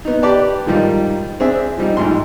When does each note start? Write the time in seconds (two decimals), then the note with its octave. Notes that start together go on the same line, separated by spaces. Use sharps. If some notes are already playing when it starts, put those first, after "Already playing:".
0.05 B3 D#4
0.23 G4 B4 D5 A5
0.66 G#2 D#3 F3 G3 D#4 F4
1.40 C4 D4 G#4 E5
1.77 F3 G3 D#4
1.97 A1 G#2 F3 C6